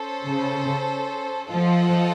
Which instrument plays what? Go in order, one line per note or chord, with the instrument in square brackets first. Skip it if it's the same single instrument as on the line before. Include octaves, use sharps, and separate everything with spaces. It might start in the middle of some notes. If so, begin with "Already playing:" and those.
Already playing: [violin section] C#4 A4 C5
[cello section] C#3
[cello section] F3 [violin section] F4 A4 C5 D#5 F#5